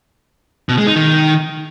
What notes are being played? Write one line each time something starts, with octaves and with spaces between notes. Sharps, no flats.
B2
G#3
D#4
D#3